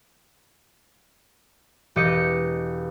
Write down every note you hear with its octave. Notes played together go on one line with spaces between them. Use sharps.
E1 G4 D#5 C#7